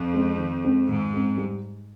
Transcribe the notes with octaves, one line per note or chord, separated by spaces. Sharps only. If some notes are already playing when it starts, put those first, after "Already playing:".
Already playing: F2
G#3 C4
D#3
G#3 C4
G#2 D#3
G#3 C4
G3